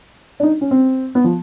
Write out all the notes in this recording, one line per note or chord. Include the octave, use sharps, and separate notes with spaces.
D4
D#4
C#4
C4
B3
F3